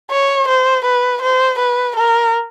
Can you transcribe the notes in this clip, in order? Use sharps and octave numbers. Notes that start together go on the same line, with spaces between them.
C#5
C5
B4
C5
B4
A#4